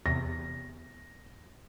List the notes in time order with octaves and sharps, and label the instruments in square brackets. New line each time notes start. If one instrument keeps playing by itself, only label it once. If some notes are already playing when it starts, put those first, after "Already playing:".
[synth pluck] E2 C3 [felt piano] A#6